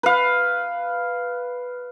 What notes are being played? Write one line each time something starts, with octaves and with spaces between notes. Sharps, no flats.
B4 F5